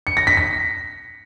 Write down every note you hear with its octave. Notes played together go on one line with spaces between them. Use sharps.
C#7
A#6
B6
B6